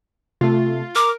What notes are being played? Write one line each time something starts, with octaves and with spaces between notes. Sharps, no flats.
C3 A3 F4
A#4 D6 F6